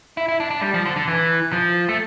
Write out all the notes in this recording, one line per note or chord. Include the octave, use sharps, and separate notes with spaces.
E4
E4
D4
D4
G3
F3
D3
D3
E3
F3
A3